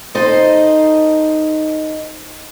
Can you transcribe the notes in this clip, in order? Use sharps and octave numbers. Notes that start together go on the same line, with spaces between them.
D#4 A4 C5 D#5